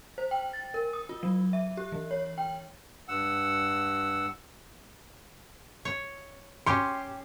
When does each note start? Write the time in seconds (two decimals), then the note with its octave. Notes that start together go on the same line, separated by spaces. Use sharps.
0.18 C5
0.31 G5
0.53 A6
0.74 A#4
0.93 D#6
1.09 F4
1.23 F#3
1.53 E5
1.77 G4
1.92 E3
2.11 C#5
2.38 G5
3.08 G2 F#5 E6
5.85 C#5
6.66 C#4 G4 C6